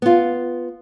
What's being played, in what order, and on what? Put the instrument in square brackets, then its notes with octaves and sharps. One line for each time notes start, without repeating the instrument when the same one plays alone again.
[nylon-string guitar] B3 F4